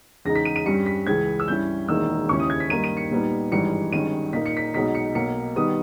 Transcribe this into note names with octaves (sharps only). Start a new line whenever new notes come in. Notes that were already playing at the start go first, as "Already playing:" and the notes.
E2 C#3 G#3 D#4 A#6
B6
D#7
D#7
G2 G3 C#4 C#7
B6
C#2 C#3 E3 G#6
E6
G2 G3 C#4 E4 G6
E1 E2 D#3 A#3 E4 E6
D#2 C#3 G#3 C#4 E4 C#6
D#6
G#6
B6
G2 D#3 A#3 D#4 D#7
D#7
C#7
A#2 G3 B3 D#4
G#1 G2 E3 G#3 D#4 C#7
G1 G2 D#3 G#3 C#4 D#7
A#2 A#3 D#4 B6
C#7
B6
B1 B2 G#3 D#4 B6
C#7
B1 B2 A#3 C#7
D#3 G3 B3 D#6